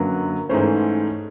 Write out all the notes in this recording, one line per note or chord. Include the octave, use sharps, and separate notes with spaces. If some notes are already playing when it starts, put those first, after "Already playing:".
Already playing: F#2 D3 F#3 A#3 B4
G#2 E3 A3 C#4 C5